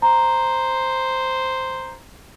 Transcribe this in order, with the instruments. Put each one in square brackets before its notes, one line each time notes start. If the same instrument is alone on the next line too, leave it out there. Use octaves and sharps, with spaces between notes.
[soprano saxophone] C5 [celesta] A#5